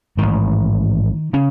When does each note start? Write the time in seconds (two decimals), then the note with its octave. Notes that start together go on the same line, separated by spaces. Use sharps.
0.17 A1 G#2 D#3
1.33 C#3 C#4